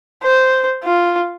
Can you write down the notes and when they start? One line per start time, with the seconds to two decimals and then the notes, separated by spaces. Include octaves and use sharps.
0.23 C5
0.84 F4